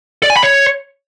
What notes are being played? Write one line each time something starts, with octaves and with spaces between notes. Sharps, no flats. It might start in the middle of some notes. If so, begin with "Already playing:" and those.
D5
G#5
B5
C#5